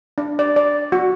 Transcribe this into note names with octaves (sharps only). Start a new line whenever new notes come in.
D4
D5
D5
F#4